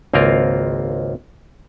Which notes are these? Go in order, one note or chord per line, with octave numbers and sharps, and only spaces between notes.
G#1 C#2 A#3 C4 F4 A#4